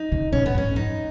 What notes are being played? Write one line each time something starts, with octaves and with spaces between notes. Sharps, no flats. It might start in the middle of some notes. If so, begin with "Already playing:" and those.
Already playing: D#4
C#3
A#2 C#4
B3
G#2
C#4
F#2 D#4